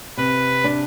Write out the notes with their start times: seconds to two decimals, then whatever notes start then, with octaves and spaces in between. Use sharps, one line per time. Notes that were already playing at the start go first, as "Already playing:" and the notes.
0.17 C3 B4
0.64 D4